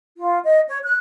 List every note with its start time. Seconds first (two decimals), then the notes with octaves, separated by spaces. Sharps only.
0.17 F4
0.44 D#5
0.67 C#5
0.83 F#6